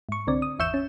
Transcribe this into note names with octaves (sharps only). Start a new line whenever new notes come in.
G#2 C#6
C2 D3 C4 D5
D#6
G#1 E2 E5 C#6 G6 E7
C#4